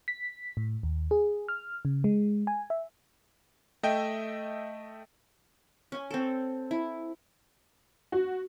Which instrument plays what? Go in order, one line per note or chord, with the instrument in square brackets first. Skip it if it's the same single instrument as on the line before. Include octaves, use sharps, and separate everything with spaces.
[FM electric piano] B6
A2
D#2
G#4
F6
C#3
G#3
G#5
E5
[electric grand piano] A3 D#5 E5 G5
[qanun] C#4 G#5
C4 A4
E4
[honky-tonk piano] F#4